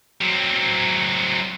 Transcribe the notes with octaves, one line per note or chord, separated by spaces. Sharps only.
F#3 C4